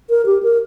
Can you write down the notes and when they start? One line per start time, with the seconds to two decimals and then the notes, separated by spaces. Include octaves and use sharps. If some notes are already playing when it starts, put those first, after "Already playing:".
0.10 A#4
0.26 G4
0.43 A#4